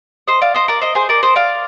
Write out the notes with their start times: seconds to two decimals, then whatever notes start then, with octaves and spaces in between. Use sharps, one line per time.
0.27 C5 D#5
0.42 D5 F5
0.54 C5 D#5
0.68 A#4 D5
0.81 C5 D#5
0.95 G#4 C5
1.09 A#4 D5
1.23 C5 D#5
1.36 D5 F5